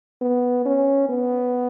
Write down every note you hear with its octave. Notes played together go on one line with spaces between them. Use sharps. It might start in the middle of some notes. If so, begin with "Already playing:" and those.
B3
C#4
B3